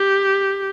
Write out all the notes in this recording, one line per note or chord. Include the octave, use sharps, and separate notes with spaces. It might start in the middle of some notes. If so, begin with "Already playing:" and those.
Already playing: G4